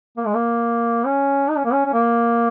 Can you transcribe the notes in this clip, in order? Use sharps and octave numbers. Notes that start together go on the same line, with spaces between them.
A#3
G#3
A#3
C#4
D#4
C#4
A#3
C#4
C#4
A#3